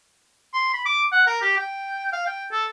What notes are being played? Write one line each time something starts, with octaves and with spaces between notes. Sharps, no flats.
C6
B5
D6
F#5
A#4
G4
G5
F5
G5
A4